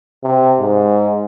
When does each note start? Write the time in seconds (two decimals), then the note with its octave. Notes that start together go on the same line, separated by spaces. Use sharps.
0.23 C3
0.60 G#2